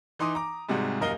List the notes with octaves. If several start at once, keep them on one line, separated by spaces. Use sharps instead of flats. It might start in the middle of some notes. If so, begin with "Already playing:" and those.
E3 D#4 C6 D6 D#6
A#5 D6
G#2 C3 G3 G#3 F#4
D#1 F#2 A#4 D#5 F5 G7